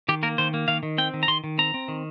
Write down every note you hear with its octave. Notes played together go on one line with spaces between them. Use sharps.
D#3 G4
A#3 A#4
D#3 C5
A#3
D#3 F5
D#3
C4 G5
D#3
A#5
D#3 C6
D#3
C4 A#5
C4
D#3